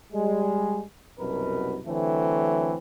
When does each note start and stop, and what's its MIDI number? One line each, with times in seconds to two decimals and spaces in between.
0.13 0.82 55
0.13 0.82 56
1.19 1.79 36
1.19 1.79 42
1.19 1.79 47
1.19 1.79 70
1.19 1.79 71
1.86 2.76 50
1.86 2.76 52
1.86 2.76 54
1.86 2.76 57
1.86 2.76 60